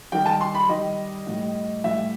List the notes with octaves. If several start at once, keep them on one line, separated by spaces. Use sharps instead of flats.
D#3 G3 G5
A5
C6
B5
D#3 G3 D#5
A2 G3
A2 G3 E5